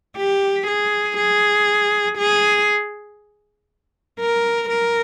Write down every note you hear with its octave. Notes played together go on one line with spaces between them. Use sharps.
G4
G#4
G#4
G#4
A#4
A#4